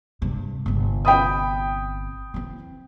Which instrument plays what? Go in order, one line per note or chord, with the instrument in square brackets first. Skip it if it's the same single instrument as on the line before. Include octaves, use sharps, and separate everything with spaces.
[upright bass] G2 C3
G1 C3
[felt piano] G5 B5 D#6
[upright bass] E3 C4